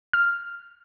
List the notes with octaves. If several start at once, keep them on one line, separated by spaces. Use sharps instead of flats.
F6